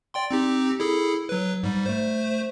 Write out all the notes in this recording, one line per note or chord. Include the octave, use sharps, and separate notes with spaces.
D5 G5 C6
C4 D#4 G4
E4 G#4 A4
F#3 B4
G#2 G3
A3 C5